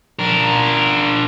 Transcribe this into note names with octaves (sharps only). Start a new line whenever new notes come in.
D4 A#4